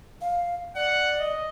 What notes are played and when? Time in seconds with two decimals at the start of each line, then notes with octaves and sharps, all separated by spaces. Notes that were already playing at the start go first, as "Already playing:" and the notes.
0.21 F5
0.76 D5 F#5
1.19 D#5